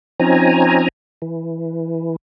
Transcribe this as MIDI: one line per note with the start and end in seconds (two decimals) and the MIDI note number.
0.20 0.88 53
0.20 0.88 60
0.20 0.88 61
0.20 0.88 63
0.20 0.88 80
0.20 0.88 82
1.22 2.16 52